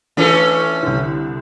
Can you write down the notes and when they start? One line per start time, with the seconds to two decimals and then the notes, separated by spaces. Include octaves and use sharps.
0.17 E3 A3 C#4 D4 F4 A4
0.83 C2 D3